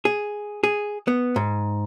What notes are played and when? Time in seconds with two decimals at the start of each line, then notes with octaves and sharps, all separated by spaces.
0.05 G#4
0.64 G#4
1.08 B3
1.36 G#2